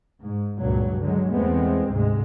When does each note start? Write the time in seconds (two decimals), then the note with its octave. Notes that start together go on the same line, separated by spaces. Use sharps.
0.22 G#2
0.61 C#2 G2 A#2 F#3
1.02 D3 F#3 G#3
1.32 E2 G#3 A3 B3 C4
1.89 D2 G#2 C3 G#3